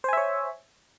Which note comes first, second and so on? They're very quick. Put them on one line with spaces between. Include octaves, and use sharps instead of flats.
C5 G#5 E5 C#5